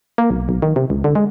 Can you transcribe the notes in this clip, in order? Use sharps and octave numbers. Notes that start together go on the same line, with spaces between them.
A#3
B1
B1
D#3
C3
C#2
D3
G#3